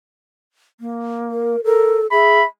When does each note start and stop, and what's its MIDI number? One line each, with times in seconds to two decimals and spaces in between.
0.80 1.56 58
1.31 1.64 70
1.64 2.07 69
1.64 1.98 70
2.11 2.40 68
2.11 2.42 76
2.11 2.46 83